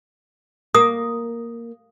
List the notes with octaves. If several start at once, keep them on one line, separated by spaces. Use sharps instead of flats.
A#3 D#6